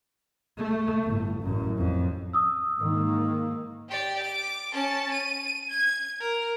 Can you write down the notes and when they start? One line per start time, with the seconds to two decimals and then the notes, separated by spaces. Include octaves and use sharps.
0.58 A3
1.04 G1 A2
1.42 A1 F#2
1.78 F2
2.33 D#6 E6
2.80 G#2 D#3 A#3
3.89 G4 D5
4.23 D6
4.72 C#4 A5
5.12 D#7
5.70 G#6
6.20 A#4